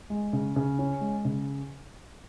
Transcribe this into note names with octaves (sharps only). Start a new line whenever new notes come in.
G#3
C#3
C#3
C#4
G#3
C#3